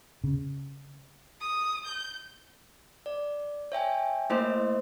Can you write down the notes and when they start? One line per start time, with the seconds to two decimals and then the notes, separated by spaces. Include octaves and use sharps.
0.24 C#3
1.41 D#6
1.85 G6
3.06 D5
3.72 C#5 E5 G5 G#5
4.30 A3 A#3 E4 C5 D#5 C6